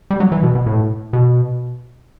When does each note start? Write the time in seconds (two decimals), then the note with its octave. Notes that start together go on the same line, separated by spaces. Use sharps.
0.11 G3
0.20 F#3
0.32 E3
0.43 B2
0.55 B2
0.66 A2
1.13 B2